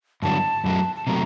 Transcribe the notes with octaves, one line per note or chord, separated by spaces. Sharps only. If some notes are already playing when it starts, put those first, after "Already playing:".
G2 D3 F#3 A5
F#2 F#3 A3
A5
C3 F#3 A3 A#5